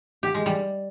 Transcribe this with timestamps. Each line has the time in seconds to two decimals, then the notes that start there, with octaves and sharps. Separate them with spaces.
0.23 G4
0.34 G#3
0.46 G3